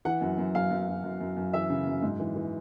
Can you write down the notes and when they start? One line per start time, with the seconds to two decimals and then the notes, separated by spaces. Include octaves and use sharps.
0.05 E3 F#5
0.21 F#2
0.38 F#2
0.55 F#2 F5
0.70 F#2
0.88 F#2
1.03 F#2
1.20 F#2
1.37 F#2
1.53 E3 E5
1.70 C#3
1.87 F#2
2.02 G#2
2.20 E3
2.36 E3